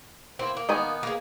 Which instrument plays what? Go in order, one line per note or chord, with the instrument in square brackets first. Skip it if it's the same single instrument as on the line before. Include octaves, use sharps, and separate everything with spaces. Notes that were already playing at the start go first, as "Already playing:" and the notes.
[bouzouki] A#3 C4 E4
A#3
[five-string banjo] D#3 B3 G#5
[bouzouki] A#3 G#4